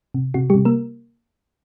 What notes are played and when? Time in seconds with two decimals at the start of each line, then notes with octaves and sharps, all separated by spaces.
0.14 C3
0.34 C3 F#4
0.50 G3 G4
0.55 C3
0.65 A#3 A#4